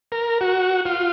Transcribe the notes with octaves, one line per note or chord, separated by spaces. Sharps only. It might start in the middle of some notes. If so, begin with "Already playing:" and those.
A#4
F#4
F4